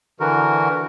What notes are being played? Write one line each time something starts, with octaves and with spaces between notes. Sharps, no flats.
D3 E3 F#4 A#4